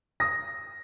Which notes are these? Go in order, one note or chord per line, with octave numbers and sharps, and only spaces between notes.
D#6 A#6